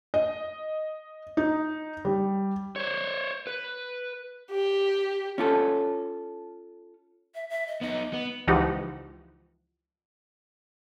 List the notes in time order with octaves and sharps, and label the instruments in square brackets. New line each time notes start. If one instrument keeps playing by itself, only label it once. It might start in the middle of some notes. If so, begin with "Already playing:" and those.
[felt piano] D#5
D#4
G3
[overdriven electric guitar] C5 C#5
B4
[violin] G4
[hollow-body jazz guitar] C#4 F4 A4
[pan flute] E5
E5
D#5
[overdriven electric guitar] B3 D#4 [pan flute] D#5
[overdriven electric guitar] B3
[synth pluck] C#2 E3 F3 D#4 G4 F#5